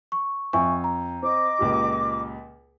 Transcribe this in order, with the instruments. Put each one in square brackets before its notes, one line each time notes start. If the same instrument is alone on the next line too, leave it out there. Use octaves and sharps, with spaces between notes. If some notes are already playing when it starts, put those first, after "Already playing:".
[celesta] C#6
[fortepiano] F2 [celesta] E5 G#5 C#6
[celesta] A#5
[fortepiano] C4 [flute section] D#5 D6
[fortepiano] C#2 A#2 G4